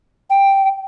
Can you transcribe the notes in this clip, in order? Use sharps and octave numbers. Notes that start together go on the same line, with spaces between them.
G5